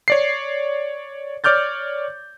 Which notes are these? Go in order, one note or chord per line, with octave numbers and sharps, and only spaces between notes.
C#5 D5 C7
C#5 D5 D6 F6 G6 A6